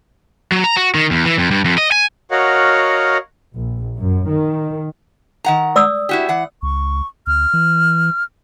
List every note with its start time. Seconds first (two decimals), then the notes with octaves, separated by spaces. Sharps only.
0.52 F#3
0.64 A#5
0.77 F#4
0.95 D#3
1.11 E2
1.26 E3
1.38 F2
1.51 G2
1.65 F2
1.78 D#5
1.92 G#5
2.31 F#4 A#4 C#5 D#5 F5 F#5
3.56 A#1
3.97 F#2
4.30 D#3
5.44 D#3 F#5 A#5
5.76 D5 D#6 E6
6.09 E4 F#4 G4
6.29 E3 F#5
6.63 C#2 C#6
7.27 D2 F6
7.53 E3